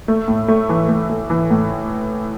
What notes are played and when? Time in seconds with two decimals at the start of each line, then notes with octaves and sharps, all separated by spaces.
0.08 A3
0.28 A2
0.48 A3
0.69 E3
0.89 A3
1.10 A3
1.30 E3
1.50 A2